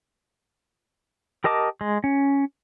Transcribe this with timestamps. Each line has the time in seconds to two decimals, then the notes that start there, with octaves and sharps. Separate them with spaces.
1.44 G4 A#4 D#5 A5 D6
1.81 G#3
2.04 C#4